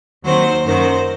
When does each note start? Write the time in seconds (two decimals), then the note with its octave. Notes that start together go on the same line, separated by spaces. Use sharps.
0.24 D#2 D#3 F#3 C4 C5
0.65 F#2 D#3 F#3 C5